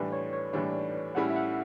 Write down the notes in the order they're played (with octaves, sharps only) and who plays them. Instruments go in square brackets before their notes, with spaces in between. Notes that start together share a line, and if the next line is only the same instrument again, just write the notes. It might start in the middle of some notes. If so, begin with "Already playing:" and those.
Already playing: [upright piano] A2 E3 G3 D4 [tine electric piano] B4
[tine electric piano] C#5
C#5
[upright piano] A2 E3 G3 D4 [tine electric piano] D5
[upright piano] A2 G3 C#4 E4 [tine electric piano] F#5
[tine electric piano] E5
F#5